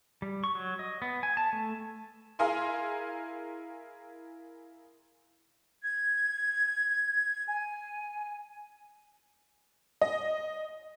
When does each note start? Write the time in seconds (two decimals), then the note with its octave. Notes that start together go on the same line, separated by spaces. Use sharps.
0.22 G3
0.44 C#6
0.55 F#3
0.79 D#5
1.02 B3
1.23 G#5
1.37 A5
1.53 A3
2.39 E4 G#4 A#4 F5 G#5 C6
5.82 G#6
7.48 G#5
10.01 D#5